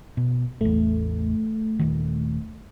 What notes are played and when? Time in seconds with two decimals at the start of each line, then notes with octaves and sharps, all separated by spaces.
0.17 B2
0.61 A1 E2 A3
1.79 D#1 C2 D#3